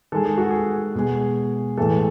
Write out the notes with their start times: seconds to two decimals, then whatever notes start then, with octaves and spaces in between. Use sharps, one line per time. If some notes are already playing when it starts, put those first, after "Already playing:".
0.12 D#3 G#3 A4
0.25 G#4
0.38 F#4
0.50 G#4
0.95 B2 G#3
1.78 A2 E3 G#3 A4